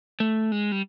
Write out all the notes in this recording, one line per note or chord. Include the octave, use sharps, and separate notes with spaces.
A3
G#3
G3